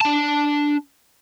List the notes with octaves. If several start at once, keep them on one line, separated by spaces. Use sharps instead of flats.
D4 A5